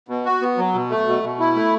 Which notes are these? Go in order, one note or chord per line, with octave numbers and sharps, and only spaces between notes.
B2
F#4
B3
F#3
B2
A3
B2
B2
E4
A3